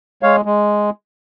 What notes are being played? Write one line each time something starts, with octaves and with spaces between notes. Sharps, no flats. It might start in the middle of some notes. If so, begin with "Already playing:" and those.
G#3 C#5 F5
G#3